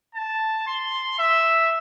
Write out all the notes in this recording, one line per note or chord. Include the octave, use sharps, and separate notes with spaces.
A5
C6
E5